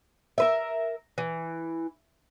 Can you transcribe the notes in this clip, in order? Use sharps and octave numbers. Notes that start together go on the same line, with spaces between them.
A#4 B4 E5
E3